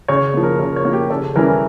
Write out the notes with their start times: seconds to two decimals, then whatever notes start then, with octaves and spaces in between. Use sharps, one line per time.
0.08 C#3 C#5
0.34 F3 A#3
0.43 A#4
0.59 C#3 A#4
0.76 C#5
0.85 F3 A#3
0.93 G4
1.10 C#3 A4
1.35 E3 G3 C#4 A#4